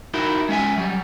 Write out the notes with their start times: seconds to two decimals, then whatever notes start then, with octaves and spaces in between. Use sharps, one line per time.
0.14 D#4 E4 F#4 A#4
0.49 G#3 C#4 E5 G#5
0.78 F#3 G3